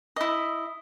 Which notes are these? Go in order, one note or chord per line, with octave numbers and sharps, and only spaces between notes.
E4 D#5